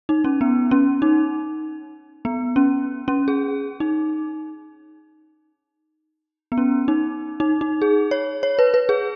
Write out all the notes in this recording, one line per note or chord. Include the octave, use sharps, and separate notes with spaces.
D#4
C#4
B3
C#4
D#4
B3
C#4
C#4
G#4
D#4
B3
C#4
D#4
D#4
D#4
G#4
C#5
C#5
B4
B4
G#4